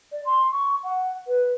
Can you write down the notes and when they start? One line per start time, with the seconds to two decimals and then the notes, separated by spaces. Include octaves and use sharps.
0.12 D5
0.25 C6
0.52 C#6
0.83 F#5
1.27 B4